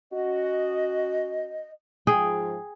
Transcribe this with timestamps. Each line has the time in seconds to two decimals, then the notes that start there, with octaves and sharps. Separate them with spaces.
0.13 C#4 F#4 D#5
2.07 G#2 F3 G#4 G5